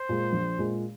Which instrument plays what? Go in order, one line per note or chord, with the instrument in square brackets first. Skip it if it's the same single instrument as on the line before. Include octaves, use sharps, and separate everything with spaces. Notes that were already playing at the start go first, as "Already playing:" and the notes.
Already playing: [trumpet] C5
[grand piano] A#2 G#3
A#1
A#2 G#3